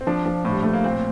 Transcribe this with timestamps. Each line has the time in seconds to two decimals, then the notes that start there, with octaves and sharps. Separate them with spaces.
0.01 C4
0.07 F3 D4
0.26 F3
0.45 A2
0.52 G3
0.63 A2 A3
0.73 A#3
0.84 A#2 C4